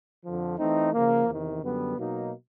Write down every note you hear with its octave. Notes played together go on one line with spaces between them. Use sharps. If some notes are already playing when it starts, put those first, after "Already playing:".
F2 D3 F3
E3 A3 C4 D#4
C#3 F3 A#3
E2 C3 D#3
F#2 D3 G3 B3
B2 F#3 A#3 D#4